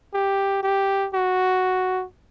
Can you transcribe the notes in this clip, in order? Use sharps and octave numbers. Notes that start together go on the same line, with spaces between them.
G4
G4
F#4